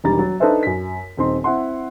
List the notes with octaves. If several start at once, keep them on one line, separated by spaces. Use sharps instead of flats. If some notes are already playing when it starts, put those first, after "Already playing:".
E1 D#3 G3 A#5 A6
F#3
D4 D#4 A4 B4 C5 E5
F#2 B6
D#1 C4 D#4 C6
C4 E4 F#5 C6